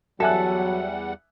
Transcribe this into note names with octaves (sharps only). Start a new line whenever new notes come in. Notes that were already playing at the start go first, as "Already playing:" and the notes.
E2 F#3 G3 A4 E5 F#5 G#5 F#6